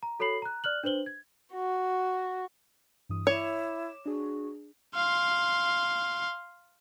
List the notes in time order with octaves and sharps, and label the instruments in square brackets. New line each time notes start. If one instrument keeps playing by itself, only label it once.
[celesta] A#5
F#4 A4 C#5 B5 C7 F#7
A#5 F#6
D5 F6 F#6 F#7
D4 B4 C5 F#7 G7
G#6
[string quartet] F#4
[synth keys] G2 E3 D#6
[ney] E4 [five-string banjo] C#5 [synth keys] D6 E7
[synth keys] D4 G#4 [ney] F#4
[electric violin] F5 C6